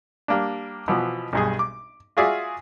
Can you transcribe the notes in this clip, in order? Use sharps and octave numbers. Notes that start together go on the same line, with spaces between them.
G3 A#3 D4
B2 E3 F3
B1 G2 G#4
D6
F4 F#4 G#4 D5 E5 F5